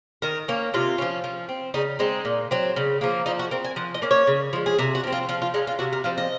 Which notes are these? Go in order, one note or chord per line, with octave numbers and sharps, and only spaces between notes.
D#3 A#4
A#3 C#4
C3 F4
F3 A#3 C#4
F3
C4
C#3 D#4
G#3 C4 D#4
A#2
F#3 C4
C#3
F3 A#3
F3 D#4
F#4
C4 A#4
G#5
F3 F#5
D#5
A#3 C#4
C#5
C#3
F3 G#3
G#4
C3 A#4
F#4
F3 C4
F4
F3 F4
F4
G#3 C#4 D#4
F4
C3 F#4
A#4
F3 C4 F5
D#5